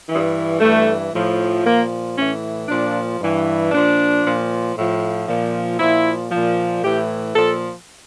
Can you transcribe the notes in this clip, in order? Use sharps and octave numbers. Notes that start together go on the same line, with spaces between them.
G2 E3
G2 E3 A3
A2 F3
A#2 F3 A#3
A2 E3 C#4
A#2 F3 D4
G2 E3
A#2 F3 D4
A#2 F3
A2 F3
A#2 F3
A#2 F3 E4
A#2 F3
A2 E3 G4
A#2 F3 A4